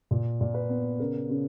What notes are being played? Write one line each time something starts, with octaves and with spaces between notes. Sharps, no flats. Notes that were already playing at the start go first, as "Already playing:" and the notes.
A#2
A#2
B4
B3
C#3 A#4
C#3